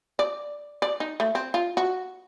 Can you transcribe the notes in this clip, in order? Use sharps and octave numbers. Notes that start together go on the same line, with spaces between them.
D5
D5
D#4
A3
C4
F4
F#4